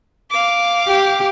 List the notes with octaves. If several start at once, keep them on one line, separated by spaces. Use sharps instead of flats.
F5 D6
G4